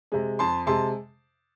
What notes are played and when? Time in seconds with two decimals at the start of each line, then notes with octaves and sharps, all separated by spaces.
0.12 C3 G#3
0.39 F2 A5 C6
0.66 C3 G#3 A5 C6